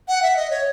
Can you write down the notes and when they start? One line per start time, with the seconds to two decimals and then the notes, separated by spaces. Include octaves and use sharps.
0.08 F#5
0.22 E5
0.36 D#5
0.50 C#5